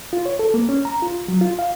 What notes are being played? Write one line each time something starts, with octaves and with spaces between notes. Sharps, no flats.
F4
C#5
A4
A#3
C#4
A#5
F4
F#3
F4
F5